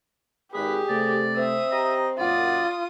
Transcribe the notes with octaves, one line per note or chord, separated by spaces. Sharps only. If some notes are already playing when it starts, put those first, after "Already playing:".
G#1 G4 G#4 B4
C3 A3 D5
C4 E5 D#6
G4 D#5 G5 A#5
F#2 A#2 F4 D5 F#5 D#6